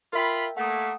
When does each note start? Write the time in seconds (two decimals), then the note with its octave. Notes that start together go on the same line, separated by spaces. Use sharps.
0.13 F4 A#4 E5 G5 B5
0.57 A3 A#3 F#5 D#6